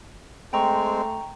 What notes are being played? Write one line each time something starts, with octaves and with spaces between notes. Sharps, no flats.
G#3 A3 C4 G5 A#5 C#6